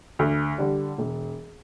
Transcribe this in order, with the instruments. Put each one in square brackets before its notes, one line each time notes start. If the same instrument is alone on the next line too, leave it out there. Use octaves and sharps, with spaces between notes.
[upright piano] D2
D3 G3
E1